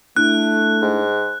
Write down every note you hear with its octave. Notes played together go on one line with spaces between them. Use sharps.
A3 D4 E4 F#6
G#2